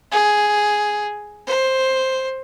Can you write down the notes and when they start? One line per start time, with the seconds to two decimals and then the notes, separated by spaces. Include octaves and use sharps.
0.12 G#4
1.47 C5